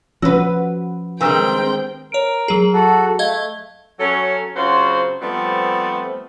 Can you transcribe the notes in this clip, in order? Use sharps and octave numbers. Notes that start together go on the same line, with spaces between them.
F3 C#4 F#4 B4 E6
D#3 G3 G#3 C4 D4 B4 G5 E6
A#4 C#5 D7
F#3 G#4
F#4 A4
A3 D#5 F5 G#6
F#3 C#4 A4
C#3 F#3 C4 F4 F#4 C5
F3 G3 A3 B3 C4